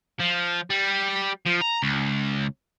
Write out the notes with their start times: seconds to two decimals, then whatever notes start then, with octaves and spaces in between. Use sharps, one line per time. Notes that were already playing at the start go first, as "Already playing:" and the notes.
0.20 F3
0.70 G3
1.46 F3
1.61 A#5
1.82 C#2